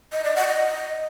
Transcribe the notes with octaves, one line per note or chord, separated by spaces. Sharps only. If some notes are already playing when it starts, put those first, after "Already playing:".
D#5
D5
F#5
D#5